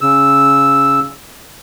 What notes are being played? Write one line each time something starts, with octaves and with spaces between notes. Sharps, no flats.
C#3 E6